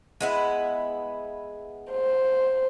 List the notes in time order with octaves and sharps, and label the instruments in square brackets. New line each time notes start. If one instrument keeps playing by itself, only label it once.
[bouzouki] G#3 B3 E4
[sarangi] C5